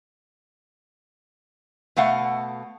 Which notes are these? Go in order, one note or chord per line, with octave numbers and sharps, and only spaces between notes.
B2 A3 F5 F#5